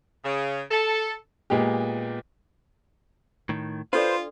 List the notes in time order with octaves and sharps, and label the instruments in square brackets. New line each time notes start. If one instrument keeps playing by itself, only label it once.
[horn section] C#3
A4
[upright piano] A#2 G#3 B3 G4
[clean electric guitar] A2 D#3
[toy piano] D4 A4 D5 [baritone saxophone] F4 [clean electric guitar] B4 [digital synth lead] C5